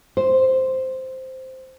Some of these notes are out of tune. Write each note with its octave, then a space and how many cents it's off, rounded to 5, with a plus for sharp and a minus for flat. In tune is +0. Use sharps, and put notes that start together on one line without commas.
C5 -5